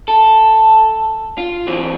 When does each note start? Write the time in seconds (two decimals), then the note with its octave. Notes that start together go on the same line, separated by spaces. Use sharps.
0.08 A4
1.38 F4
1.67 E3 F#3 C4 F4